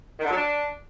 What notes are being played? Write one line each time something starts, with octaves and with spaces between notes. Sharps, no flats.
D#3
D3
F#3
D4